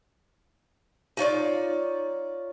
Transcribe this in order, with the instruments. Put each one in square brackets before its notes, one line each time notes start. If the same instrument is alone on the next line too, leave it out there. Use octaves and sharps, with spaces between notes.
[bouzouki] D#4 F4 C#5 D5